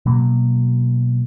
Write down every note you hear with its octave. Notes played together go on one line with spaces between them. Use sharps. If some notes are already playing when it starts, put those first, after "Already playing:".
B2 F#3 A#3